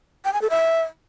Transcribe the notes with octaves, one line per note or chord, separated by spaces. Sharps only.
G5
G#5
A4
E5